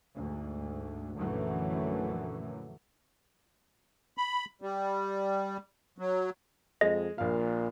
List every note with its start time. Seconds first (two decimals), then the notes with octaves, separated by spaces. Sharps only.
0.15 D2 G#2
1.15 A#1 F#2 D3 E3 F#3 A3
4.18 B5
4.62 G3
5.98 F#3
6.81 F2 G#3 D#5
7.18 A#1 A#2 F5